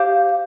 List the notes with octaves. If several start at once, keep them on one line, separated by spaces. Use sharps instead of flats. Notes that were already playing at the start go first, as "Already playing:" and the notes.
Already playing: G4 C5 F5